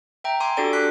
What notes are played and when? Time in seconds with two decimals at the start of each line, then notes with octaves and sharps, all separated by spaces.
0.24 E5 G5 A#5
0.40 G#5 C6 D6
0.57 D4 F#4 G4 A4 D5 D7
0.73 D6 F#6 B6